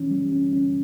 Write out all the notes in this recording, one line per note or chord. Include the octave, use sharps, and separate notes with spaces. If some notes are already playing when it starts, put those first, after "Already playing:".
Already playing: E3 C#4
G3
C#4
C#4